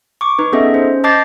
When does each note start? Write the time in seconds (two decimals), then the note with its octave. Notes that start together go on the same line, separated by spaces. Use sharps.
0.21 C#6 D6
0.39 D#4 B4
0.52 B3 C#4 G#4 A4 D#5 E5
0.74 C#4 C5
1.04 D#5 A5 D6 G6 A6 C7